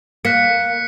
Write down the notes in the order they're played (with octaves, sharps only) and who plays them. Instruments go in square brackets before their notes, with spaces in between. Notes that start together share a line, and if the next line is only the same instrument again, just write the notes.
[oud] A#3 [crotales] F#6 B6 C#7